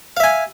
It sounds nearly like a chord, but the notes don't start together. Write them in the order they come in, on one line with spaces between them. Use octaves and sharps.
F5 E5 G#5